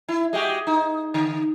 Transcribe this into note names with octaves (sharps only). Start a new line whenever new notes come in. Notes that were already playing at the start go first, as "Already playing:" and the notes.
E4
G#3 F#4 G4
D#4
D3